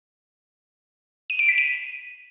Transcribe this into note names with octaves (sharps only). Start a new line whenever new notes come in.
D#7
D7
B6
D#7